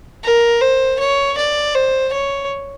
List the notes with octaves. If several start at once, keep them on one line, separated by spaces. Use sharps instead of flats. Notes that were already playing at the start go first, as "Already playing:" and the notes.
A#4
C5
C#5
D5
C5
C#5